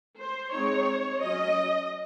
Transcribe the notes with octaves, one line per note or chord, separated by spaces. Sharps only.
C5
G#3 C4 D#4 C#5
F#3 C#4 D#5